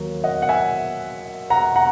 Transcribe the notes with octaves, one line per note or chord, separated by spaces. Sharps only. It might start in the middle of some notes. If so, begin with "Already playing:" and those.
Already playing: D#2 F#3 A#3
D#5 F#5
F#5
E5 G#5
F#5 A#5
F#5 A#5